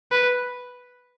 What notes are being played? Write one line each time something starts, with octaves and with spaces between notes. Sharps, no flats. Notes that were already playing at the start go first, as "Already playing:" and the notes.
B4